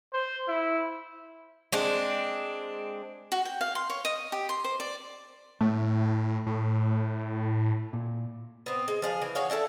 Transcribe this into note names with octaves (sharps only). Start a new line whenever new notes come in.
C5
E4
G#3 C4 D4
F#4
G5
F5
C6
C#5
D#5
G4
C6
C5
D5
A2 A3 A5
A2
A#2
B3 C4
G#3
F3 G#4 F5
E3
F#4 G#4 C#5 F5
D4 E4 G4 A4